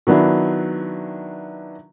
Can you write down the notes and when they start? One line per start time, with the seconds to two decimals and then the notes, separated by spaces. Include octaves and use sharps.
0.07 D#3 F#3 B3 D4 E4